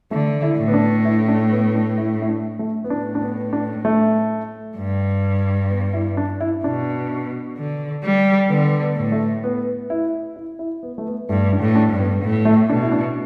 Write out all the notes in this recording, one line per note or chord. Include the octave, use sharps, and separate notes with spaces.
D3 A3
E4
A2
B3
D4
E4
D4
B3
D4
E4
E4
D4
A3
B3
A2 D4
D4
B3
D4
A3
G2
B3
E4
D4
E4
B2 D4
D3
G3
D3 B3
B3
A2
A3
B3
E4
E4
E4
B3
A3
B3
G2 A3
D4
A2
D4
G2
B3
A2
A3
B2 D4
E4
D4